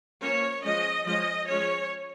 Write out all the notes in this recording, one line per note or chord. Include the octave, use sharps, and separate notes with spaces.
F3 A#3 C#4 C#5
F3 G#3 C#4 D#5
F3 G#3 C#4 D#5
F3 G#3 C#4 C#5